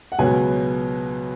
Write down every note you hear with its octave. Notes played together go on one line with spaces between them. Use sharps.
F#5
C#2 B2 F#3 B3 G#5